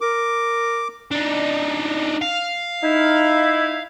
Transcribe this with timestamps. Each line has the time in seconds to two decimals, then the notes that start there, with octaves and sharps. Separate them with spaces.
0.01 A#4 D6
1.11 D4 D#4
2.21 F5
2.83 D#4 E4